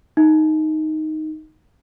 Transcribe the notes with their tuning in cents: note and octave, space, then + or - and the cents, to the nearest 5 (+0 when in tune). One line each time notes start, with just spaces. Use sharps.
D#4 +0 E5 -25